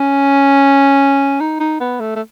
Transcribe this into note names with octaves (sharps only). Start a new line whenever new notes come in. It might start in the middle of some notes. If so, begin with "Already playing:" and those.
Already playing: C#4
D#4
D#4
B3
A3
A3